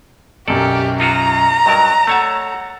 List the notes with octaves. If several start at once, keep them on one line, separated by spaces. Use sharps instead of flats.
B1 F#2 G4 A4 D5
D#4 F4 F#4 A#5
G2 F#3 A#4 D#5
A3 C#5 F#5 A5 A6